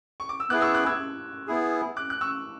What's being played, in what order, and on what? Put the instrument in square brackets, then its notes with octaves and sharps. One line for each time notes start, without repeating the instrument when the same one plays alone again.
[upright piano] C#6
D6
E6
[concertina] B3 E4 G#4 [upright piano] D6 F#6
[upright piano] C#6 E6
D6 F#6
E6 G#6
[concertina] B3 E4 G#4
[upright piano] D6 F#6
F#6
C#6 E6